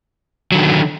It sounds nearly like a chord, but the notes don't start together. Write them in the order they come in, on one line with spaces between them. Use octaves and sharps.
F#3 D3 D#3